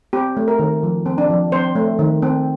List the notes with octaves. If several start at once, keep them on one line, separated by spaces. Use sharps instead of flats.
C4 G4
A3
A#4
D#3
F3
C4
D4
F3
C4 C5
A3
D#3
C4